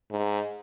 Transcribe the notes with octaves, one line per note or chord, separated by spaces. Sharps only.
G#2